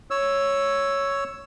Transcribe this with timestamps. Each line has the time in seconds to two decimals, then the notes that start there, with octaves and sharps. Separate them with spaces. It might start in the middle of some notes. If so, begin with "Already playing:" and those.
0.11 C#5 E6